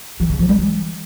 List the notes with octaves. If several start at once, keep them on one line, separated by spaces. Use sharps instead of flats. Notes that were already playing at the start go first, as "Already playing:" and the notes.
E3
C#3
F3
G3
E3